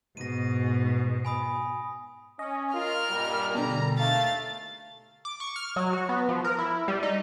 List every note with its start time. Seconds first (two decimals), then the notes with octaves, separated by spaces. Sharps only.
0.17 G#2 B2 A#6 D#7
1.25 G#5 B5 D#6
2.39 C#4 D#5
2.73 F4 A#4 F6
3.10 G2 A#2 G3
3.55 B2 D3 A#5
3.98 D#2 A3 F5 A6
5.25 D6
5.40 C#6
5.56 F6
5.76 F#3
5.93 F#4
6.09 B3
6.29 F3
6.44 A#4
6.59 E4
6.88 G3
7.03 D#4